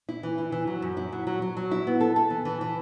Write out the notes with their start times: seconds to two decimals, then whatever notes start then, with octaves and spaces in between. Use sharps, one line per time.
0.09 E4
0.23 E3
0.38 E4
0.52 E3
0.67 F#3
0.82 F#2
0.97 E4
1.12 F#3
1.27 F#3
1.42 F#3
1.57 F#3
1.71 E4
1.87 B3
2.01 A4
2.16 A4
2.30 E3
2.45 E3
2.61 E3